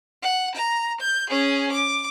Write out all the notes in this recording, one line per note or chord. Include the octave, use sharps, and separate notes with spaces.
F#5
A#5
G6
C#4 G#4
D6